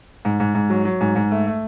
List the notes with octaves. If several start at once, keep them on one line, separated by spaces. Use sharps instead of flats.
G#2
G#2
G#2
F#3
F#3
G#2
G#2
A3
A3